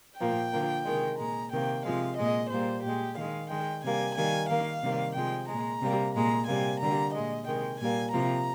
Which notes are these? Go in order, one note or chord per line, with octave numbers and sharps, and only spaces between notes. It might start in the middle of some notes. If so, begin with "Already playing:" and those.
A#2 F3 A#3 G5
D3 F3 A#3
C3 D#3 G#3
A#2 G#3 A#5
C3 D#3 A#3 G5
C3 F3 G#3 F5
A#2 G#3 D#5
A#2 G3 A#3 C5
A#2 G#3 G4
D#3 G#3 F5
D#3 G#3 G5
C3 G3 A#3 G#5
D#3 G3 A#3 G#5
D#3 A#3 F5
C3 D#3 G3 A#3
C3 F3 G#3 G5
A#2 G#3 A#5
C3 G3 A#3
A#2 G#3 A#5
C3 G3 A#3 G#5
D3 G3 A#3 A#5
A#2 G#3 D#5
C3 D#3 G#3 G5
A#2 G3 A#3 G#5
C3 F3 A#3 A#5